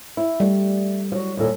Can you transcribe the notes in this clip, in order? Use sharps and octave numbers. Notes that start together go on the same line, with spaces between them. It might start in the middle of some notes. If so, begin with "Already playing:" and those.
E4
G3 A3
F3 F#3
D#2 A#2 A4